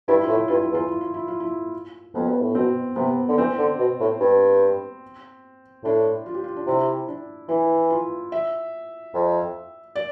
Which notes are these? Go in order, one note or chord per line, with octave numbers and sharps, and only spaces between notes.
G2 E4
F4
A2
E4
G2 F4
E4
E2
F4
E4
F4
E4
F4
E4
F2 B3
G2
A2
B2 C4
C3 B3
D3
E3 C4
D3
B2
A2
G2
A2 D4
F4
G4
F4
D4
C3 E4
D4
E3 E4
F4
E5
F2
D5